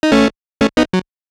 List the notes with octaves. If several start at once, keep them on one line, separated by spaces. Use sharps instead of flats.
D#4
A3 C#4
A3 C#4
B3 D#4
F#3